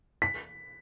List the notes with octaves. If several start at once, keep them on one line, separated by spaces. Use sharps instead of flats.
B6